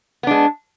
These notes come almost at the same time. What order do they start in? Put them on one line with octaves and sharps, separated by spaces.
B3 D4 G#3